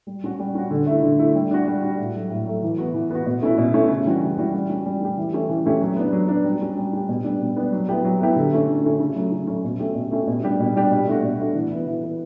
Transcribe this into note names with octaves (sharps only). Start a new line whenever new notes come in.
G3
C#4 F#4
G3
C#4 F#4
D3
A3 E4
D3
A3 E4
G3
D4 F#4
G3
D4 F#4
A2
F#3 A3
A2
F#3 A3
E3
B3 F#4
E3
B3 F#4
B2
A3 C#4 E4
B2
A3 C#4 E4
C#3
E3 G3 C#4 F#4
C#3
E3 G3 C#4 F#4
G3
C#4 G4
G3
C#4 G4
E3
A3 C#4 G4
E3
A3 C#4 G4
F#3
B3 D4
F#3
B3 D4
G3
C#4 G4
G3
C#4 G4
B2
G3 B3 D4
B2
G3 B3 D4
F#3
B3 E4 G4
F#3
B3 E4 G4
D3
A3 C#4
D3
A3 C#4
C#3
F#3 A3 C#4
C#3
F#3 A3 C#4
B2
A3 C#4 G4
B2
A3 C#4 G4
B2
G3 D4 G4
B2
G3 D4 G4
B2
A3 D4 F#4
B2
A3 D4 F#4
E3
B3 E4
E3
B3 E4